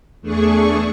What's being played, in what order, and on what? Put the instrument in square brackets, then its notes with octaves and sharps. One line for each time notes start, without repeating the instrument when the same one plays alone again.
[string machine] E2 A3 D4 G#4 C#6